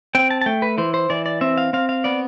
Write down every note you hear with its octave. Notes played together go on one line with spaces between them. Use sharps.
C4 G5
A5
A5
A3 G5
B4
E3 C5
C5
E3 D5
D5
C4 E5
F5
C4 F5
F5
B3 D5